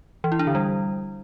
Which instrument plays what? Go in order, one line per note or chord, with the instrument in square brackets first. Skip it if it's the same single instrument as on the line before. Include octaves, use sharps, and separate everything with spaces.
[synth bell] E3
E4
D4
D3
G3